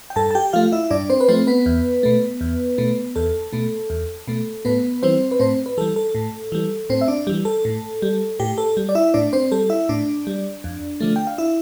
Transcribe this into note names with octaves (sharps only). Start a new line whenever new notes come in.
G5
G2 A4 A5
A5
G4 G5
F3 A3 F4 F5
E4 E5
G2 D4 D5
C4 C5
B4
F3 A3 C4 C5
B3 B4
E2
B2 A3
E2
B2 A3
E2 A4
B2 A3
E2
B2 A3
A2 B3 B4
E3 G3 C4 C5
B4
A2 C4 C5
B4
E3 G3 A4
A4
A2
E3 G3
A2 C4 C5
E5
D4 D5
E3 G3
A4
A2
G3
A2 G4
A4
G3
D5
E4 E5
A2 D4 D5
C4 C5
G3 A4
E4 E5
A2 D4 D5
G3
F2
D3 F3 A3
G5
F5
E4 E5